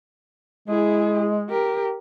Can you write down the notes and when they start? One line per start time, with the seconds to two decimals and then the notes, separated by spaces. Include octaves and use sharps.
0.68 G#3 E4 G#4
1.50 G4 A#4